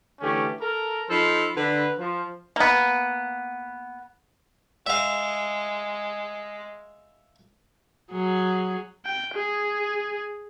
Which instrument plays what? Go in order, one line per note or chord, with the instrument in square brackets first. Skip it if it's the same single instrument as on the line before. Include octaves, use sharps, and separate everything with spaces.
[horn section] D3 E3 A3 C#4 G4
A4 A#4
F3 D#4 A4 C5 B5
D3 B4
F3
[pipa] A#3 B3
[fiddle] G#3 [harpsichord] E5 F5
[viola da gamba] F#3 G#4
[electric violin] G5
G#4